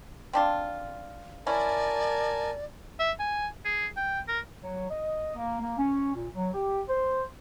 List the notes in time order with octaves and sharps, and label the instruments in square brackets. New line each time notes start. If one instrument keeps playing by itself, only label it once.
[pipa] C4 D4 F4
[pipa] C#4 E4 [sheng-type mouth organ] A#4 G#5 A5 [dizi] D5
[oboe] E5
G#5
G#4
G5
A#4
[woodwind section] F#3
D#5
A#3
A#3
C#4
A#2
F#3
G4
C5